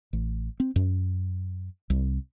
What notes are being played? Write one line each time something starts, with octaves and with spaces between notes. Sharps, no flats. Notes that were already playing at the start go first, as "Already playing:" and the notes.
A1
C4
F#2
C2